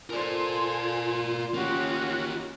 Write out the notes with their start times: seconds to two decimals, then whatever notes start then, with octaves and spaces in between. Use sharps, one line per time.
0.10 F4 A4 A#4 C5 D5 G#5
1.54 A#3 C#4 F#4 G4